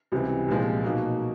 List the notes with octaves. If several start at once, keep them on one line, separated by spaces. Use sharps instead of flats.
C#2 C3 E3 G3 C4
C2 A#2 F3 G#3 C4
B2 F#3 A#3 D#4 F#4